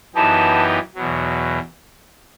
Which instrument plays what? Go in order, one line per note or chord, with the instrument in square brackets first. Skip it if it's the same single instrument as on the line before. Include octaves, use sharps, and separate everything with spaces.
[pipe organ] F#2 E3 B3 D#4 G4 [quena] A5
[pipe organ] E2 B2 F#3